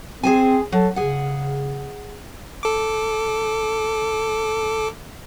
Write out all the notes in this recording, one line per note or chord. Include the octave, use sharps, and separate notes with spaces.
C4 G#4 C5 G#5
F#3 A4
C#3 G#4 F#5
A4 D6